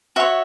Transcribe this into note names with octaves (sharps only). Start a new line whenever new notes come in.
F#4 C#5 E5